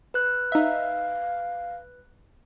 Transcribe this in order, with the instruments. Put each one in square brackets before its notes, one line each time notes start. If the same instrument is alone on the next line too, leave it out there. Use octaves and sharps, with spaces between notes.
[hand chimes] B4 F#6
[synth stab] D#4 E5 [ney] F5